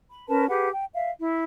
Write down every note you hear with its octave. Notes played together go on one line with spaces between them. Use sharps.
B5
C#4 A#4 B4 A5
G4 G#4 B4 F#5
G5
E5 F5
E4